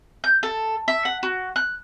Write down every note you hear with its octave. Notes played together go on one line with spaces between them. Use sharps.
G6
A4
E5
F#5
F#4
F#6